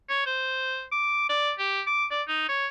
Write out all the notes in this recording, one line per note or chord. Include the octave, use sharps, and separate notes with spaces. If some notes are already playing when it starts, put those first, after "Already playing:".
C#5
C5
D6
D5
G4
D6
D5
D#4
C#5